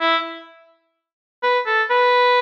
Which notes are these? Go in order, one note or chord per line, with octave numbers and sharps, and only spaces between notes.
E4
B4
A4
B4